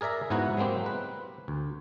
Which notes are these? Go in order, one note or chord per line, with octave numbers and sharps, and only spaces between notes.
G#4 A#4 D5 E5 A#5
G#2 B3 E4 F#4 F#5 A#5
F#3 G#3 A#3 C4 G4
B4
D2